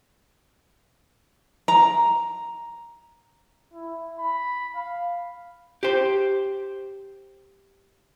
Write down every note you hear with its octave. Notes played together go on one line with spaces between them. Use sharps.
A#5
E4
B5
F5
G4 C5